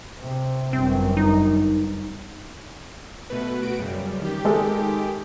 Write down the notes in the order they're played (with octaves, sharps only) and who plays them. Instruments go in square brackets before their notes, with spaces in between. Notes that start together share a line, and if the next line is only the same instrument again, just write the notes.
[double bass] C3
[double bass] G1 F#2 [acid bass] C4
[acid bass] D#4
[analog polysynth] B2 A3 B4
F#4 B4 D7
F#2 C#3 G3
D#3 G4
[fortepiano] G#3 A4